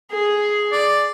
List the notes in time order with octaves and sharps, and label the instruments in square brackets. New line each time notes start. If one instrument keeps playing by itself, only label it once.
[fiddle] G#4
[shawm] D5